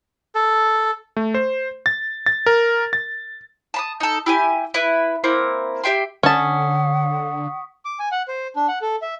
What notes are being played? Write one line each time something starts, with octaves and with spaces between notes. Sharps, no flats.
A4
A3
C5
A6
A6
A#4
A6
A5 B5 D#6
D#4 A4
E4 G4 G#5
E4 B4
A#3 C4 E4 A#5
G4 E5 G5 C6
D3 C#4 F#5 A5 C#6 D#6 B6
D6
G#5
F#5
C5
D4
F#5
A4
E5